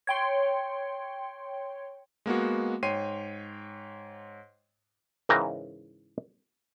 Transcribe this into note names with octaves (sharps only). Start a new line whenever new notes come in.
C#5 G5 C6
G#3 A#3 B3 F#4
G#2 C#5 G5 C6 C7 D#7
G#2 C#3 E3 A#4 G5 A#5